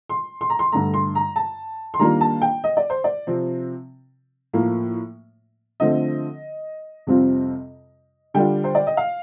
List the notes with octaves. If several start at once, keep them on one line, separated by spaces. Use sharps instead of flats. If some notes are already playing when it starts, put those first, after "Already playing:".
C6
C6
A#5
C6
G2 D3 A3 A#5
C6
A#5
A5
C6
D#3 G3 A#3 D4 F4 A#5
A5
G5
D#5
D5
C5
D5
C3 F3 C4
A2 F3 A#3
D3 F3 A3 C4 D#5
F2 C3 G3 C4 F4
D3 G3 D4 F4 G5
C5
D5
D#5
F5